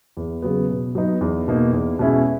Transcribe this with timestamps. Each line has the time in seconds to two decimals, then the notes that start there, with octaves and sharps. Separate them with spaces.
0.17 E2
0.42 C#3 F#3 B3
0.70 B2
0.95 F#3 B3 D#4
1.21 E2
1.48 B2 A#3 D#4
1.73 E2
1.99 B2 G#3 C#4 E4